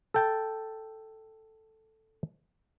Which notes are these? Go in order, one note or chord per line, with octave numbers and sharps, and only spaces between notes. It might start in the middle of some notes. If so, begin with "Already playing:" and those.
A4 G5 A5